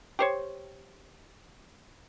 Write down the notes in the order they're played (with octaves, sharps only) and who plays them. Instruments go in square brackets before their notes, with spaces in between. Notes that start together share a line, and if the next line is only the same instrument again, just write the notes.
[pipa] G4 C5 C#5